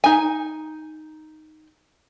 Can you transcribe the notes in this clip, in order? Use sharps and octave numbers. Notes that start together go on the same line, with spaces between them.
D#4 G#5